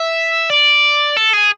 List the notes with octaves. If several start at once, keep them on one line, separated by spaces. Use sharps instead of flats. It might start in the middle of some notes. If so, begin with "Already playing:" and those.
Already playing: E5
D5
A4
G#4